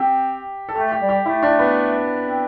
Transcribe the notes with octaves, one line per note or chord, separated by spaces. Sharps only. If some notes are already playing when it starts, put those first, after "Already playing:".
Already playing: C4 G4
A4
A3 G4
G4
G3
G4
A3 E4
D4
B3
C4